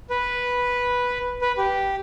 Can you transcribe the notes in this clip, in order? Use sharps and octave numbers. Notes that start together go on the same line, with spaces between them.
B4
B4
G4